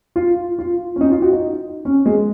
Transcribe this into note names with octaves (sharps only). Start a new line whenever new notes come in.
F4
F4
C#4
D#4
F4
F#4
D#4
C#4
G#3